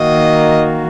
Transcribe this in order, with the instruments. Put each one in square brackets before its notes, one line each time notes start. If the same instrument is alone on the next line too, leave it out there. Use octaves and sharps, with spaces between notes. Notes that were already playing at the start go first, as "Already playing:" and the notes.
Already playing: [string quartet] D#3 A#3 F#4 [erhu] D#5